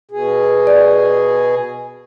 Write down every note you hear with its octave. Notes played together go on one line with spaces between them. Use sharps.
B2 G#4
D5